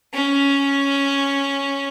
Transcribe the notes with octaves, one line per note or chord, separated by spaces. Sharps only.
C#4